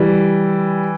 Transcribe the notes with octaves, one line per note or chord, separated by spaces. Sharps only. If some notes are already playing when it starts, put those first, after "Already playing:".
Already playing: E3 G3